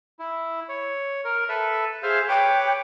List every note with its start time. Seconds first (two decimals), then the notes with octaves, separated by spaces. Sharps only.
0.19 E4
0.69 C#5
1.25 A#4
1.49 A4 B4 E5
2.03 G#4 C5 E5 F5
2.28 B4 C#5 G5 D6